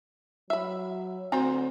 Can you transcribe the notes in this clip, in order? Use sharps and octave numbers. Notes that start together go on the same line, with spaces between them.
F#3 E5 B5
D2 C4 F#4 C5 A#5